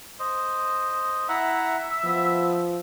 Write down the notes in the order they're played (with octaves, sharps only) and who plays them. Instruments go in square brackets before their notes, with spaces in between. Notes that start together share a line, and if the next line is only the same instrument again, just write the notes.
[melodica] C5 D#5
[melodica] E4 F#5 A#5 [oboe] E5
[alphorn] F3 [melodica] B3